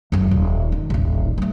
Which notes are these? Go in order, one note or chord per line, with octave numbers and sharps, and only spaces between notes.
F#1 F#2
D#1
D#3
D#1 A1
G3 A3